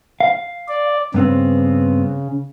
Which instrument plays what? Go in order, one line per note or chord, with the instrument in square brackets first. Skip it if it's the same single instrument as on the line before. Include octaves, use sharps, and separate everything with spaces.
[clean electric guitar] F5
[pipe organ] D5
[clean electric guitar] G2 B3 C4 [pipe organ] C#3